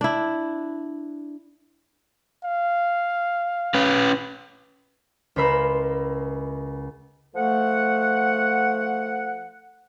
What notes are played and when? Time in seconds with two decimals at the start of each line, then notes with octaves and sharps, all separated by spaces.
0.01 D4 E4
2.44 F5
3.74 C#4 B4
5.36 C#2 E4 A#4 C5 B5 E6
7.35 F3 A3 A4 F#5